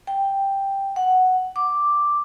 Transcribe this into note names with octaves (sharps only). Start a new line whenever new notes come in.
G5
F#5
D6